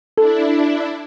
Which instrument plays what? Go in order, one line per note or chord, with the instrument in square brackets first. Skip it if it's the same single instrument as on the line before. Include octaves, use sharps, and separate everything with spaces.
[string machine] D4 E4 [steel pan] A4